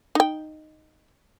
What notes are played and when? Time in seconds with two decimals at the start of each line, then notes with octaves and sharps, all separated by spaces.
0.15 D#4 G5